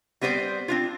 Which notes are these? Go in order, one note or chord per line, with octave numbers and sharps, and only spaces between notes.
G3 B3 C4 C5 D5
C4 D4 F4